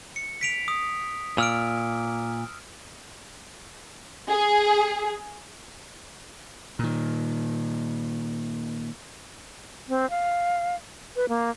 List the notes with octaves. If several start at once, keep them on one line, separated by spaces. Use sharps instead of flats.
C#7
B6 D7 F7
D#6
A#2 E6 F6 D7
G#4
A#2 D#3
C4
F5
B4
A#3